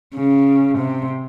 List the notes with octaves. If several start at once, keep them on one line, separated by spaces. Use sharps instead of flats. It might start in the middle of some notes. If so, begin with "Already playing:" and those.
C#3
C3